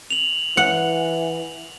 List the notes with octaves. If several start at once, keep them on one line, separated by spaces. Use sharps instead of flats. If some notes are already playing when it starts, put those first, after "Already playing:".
F7 F#7
E3 F#5